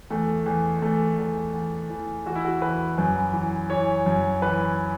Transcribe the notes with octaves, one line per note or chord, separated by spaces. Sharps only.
E2 A3
E2
E2 A3
E2
E2
E3
E3 F#4
E4
F#4
E2 B4
F#2 B4
E3
E3 C#5
F#2
E3 B4